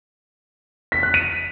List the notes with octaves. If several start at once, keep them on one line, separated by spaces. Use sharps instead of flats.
B6
F#6
D#7